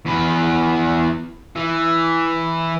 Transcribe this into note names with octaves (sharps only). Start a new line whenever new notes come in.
E2 B4
E3